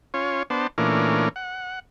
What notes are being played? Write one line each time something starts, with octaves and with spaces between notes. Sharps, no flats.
C#4 F4 C#5
B3 D4 C5 A5
A#2 E3 A3 C#4 D4 A#4
F#5